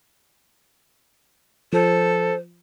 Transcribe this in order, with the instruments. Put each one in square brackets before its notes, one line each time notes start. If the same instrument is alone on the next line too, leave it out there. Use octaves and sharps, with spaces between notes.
[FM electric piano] F3 [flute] A4 [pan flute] C5